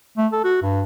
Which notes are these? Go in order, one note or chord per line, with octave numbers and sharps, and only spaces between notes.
A3
A4
F#4
G2